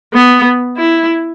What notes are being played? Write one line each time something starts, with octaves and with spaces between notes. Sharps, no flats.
B3
E4